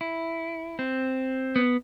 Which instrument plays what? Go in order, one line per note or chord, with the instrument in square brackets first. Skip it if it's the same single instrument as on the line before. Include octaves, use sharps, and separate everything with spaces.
[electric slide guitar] E4
C4
B3